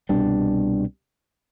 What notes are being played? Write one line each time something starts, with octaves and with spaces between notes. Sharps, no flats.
C2 B2 G3 D4